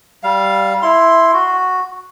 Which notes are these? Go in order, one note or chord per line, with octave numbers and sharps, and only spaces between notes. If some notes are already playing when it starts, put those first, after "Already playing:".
G3 F5
E4 C6
F#4